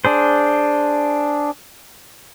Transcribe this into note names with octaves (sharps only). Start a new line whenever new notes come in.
D4 G#4 C5